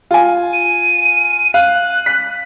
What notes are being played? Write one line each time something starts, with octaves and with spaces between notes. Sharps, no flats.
F4 G#5
D#7
F5 F#6
B6